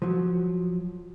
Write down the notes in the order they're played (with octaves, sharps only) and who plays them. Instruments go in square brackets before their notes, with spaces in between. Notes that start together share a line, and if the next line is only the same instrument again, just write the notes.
[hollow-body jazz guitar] F3 F#3